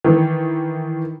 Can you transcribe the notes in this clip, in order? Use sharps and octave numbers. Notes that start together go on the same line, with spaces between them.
D#3 E3